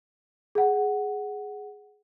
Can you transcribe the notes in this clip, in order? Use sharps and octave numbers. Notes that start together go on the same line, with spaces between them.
G#4 F#5